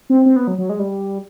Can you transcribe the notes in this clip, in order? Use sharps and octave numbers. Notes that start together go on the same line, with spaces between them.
C4
C4
B3
F#3
F#3
G#3
G3